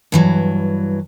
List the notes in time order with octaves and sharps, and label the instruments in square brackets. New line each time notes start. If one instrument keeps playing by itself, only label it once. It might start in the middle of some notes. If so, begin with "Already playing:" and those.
[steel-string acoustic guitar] G2 E3 F#3